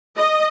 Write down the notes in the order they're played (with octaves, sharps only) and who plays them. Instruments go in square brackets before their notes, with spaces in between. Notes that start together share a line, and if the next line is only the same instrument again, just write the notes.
[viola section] D#5